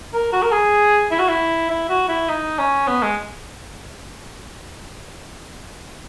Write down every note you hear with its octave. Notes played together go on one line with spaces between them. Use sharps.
A#4
F#4
A#4
G#4
E4
F#4
E4
E4
F#4
E4
D#4
C#4
B3
G#3